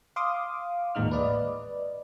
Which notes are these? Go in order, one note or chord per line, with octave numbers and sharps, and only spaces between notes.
F5 C6 D6 D#6
A1 D#2 A#2 G#3 D#4 F6
B4 D5 D#5